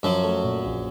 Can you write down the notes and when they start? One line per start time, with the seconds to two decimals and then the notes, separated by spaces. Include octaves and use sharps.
0.03 F#2 F3 F#3
0.24 A3
0.44 A#2
0.64 A#1